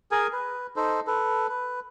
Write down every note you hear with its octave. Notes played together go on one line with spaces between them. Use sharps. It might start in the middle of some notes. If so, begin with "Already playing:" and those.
G#4 A#4 G#5
B4
D#4 A4 C5
A4 B4
B4